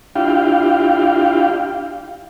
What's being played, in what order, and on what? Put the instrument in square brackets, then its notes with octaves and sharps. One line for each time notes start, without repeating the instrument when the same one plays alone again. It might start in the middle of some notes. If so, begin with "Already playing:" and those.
[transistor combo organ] D4 E4 F4 G4 F5 G5